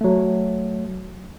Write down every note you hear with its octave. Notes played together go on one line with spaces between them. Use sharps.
F#3 A3